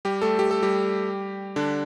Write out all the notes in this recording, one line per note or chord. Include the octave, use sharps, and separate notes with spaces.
G3 G4
A3 A4
G4
A4
G3 G4
D3 D4